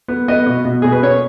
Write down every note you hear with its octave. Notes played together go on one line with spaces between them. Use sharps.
B3
B3 D#5
B2
B2
B2 G#4
B4
C#4 C#5